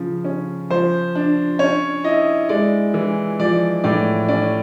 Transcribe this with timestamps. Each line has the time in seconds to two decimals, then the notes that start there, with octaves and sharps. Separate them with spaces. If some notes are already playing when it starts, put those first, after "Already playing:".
Already playing: C#3 F3
0.25 C#4
0.70 F3 C5
1.15 D4
1.59 C#4 C#5
2.04 E4 D#5
2.49 G#3 D5
2.94 E3
3.40 F3 D5
3.84 A2 D5
4.28 C#4 D5